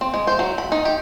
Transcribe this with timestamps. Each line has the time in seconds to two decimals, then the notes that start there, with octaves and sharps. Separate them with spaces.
0.01 C4
0.14 G#3
0.27 C5
0.39 F#3
0.58 B5
0.72 D#4
0.85 G4